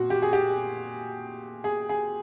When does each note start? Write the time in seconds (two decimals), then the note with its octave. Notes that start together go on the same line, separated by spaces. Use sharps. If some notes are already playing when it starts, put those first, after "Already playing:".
Already playing: A#2 F#4
0.10 G4
0.22 G#4
0.33 G4
1.64 G#4
1.89 G#4